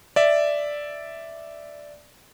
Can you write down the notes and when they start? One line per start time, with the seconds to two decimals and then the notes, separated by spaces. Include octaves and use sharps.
0.16 D5 E5